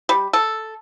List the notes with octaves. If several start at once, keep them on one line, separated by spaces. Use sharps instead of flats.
G3
A4